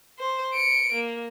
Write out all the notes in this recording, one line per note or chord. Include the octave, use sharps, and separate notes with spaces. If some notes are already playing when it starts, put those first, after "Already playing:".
C5
C#7 D7
A#3